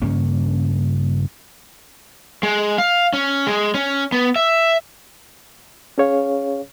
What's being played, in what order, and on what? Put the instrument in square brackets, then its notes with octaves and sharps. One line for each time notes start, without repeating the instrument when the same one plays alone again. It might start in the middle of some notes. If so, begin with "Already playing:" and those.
[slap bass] G2 C#3 A#3 C#4
[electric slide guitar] G#3
F5
C#4
G#3
C#4
B3
E5
[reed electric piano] C#4 G#4 C#5 F5